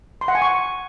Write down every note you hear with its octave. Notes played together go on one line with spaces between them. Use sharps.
C6
F#5
G#5
C#6